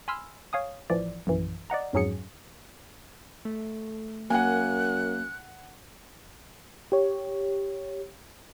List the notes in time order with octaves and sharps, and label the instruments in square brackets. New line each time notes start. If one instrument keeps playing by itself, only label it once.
[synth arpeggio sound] G#5 B5 C6 E6 F6
C#5 F5 G#5 D#6
A1 E3 F3 D5
A#1 F#2 E3
D5 D#5 F#5 A#5
F2 G#2 F#3 C#4 G#4 C#7
[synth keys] A3
[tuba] F#2 [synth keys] A#3 [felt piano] F#5 G#5 [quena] F#6
[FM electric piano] G4 C#5